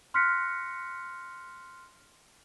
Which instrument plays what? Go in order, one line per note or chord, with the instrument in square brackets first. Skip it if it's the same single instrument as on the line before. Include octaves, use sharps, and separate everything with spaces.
[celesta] C6 F6 F#6 A#6 B6 C#7